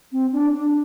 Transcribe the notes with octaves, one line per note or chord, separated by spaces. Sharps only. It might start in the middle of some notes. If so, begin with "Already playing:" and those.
C4
D4
D4